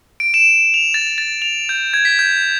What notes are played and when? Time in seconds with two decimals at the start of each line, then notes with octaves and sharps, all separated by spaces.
0.20 D7
0.34 E7
0.74 F7
0.94 A6
1.18 A6
1.42 F7
1.69 G6
1.94 G#6
2.05 B6
2.19 G6